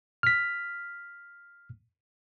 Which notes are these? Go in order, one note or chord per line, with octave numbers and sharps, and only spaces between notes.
F6 B6